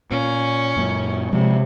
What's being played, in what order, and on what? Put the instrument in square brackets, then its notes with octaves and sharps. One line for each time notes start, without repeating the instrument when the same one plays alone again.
[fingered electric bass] A#2 [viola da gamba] C#4
[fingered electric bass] F#2 A#2
[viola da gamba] C3 [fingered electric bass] F3 G#3